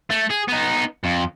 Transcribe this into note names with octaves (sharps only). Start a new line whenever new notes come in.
A3
G#4
B3 D#4
F2